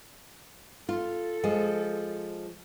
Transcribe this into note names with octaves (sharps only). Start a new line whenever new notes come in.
F4 A4
F3 G#3